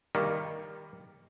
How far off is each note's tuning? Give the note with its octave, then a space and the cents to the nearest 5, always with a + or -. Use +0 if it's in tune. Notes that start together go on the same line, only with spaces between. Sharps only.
D#3 +10 G3 +25 A#3 -5